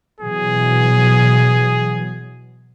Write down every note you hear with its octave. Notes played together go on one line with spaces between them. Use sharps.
B2 E3 F#3 G#4